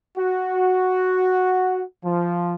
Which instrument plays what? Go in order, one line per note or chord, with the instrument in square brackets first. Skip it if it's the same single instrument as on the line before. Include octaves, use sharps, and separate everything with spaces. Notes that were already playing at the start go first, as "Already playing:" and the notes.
[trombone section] F#4
F3